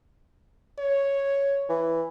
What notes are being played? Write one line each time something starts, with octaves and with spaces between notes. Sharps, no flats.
C#5
E3